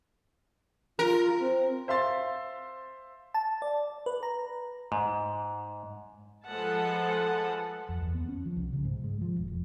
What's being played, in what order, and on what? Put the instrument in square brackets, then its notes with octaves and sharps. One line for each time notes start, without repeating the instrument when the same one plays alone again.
[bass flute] F4 [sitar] A#4
[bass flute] C4
[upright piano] C5 E5 F5 C6 A6
[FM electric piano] A5
D5
B4
A#5
[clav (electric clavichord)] G#2
[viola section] F3 G#3 A4 B4 F#5 A5
[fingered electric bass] F2
E2
B3
C#4
F3
C2
C#3
G#2
G#3
F3
E1
F1